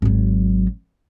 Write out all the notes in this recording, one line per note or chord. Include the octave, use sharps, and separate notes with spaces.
G#1 F#3